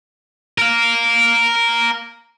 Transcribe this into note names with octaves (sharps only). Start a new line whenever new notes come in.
A#4 F5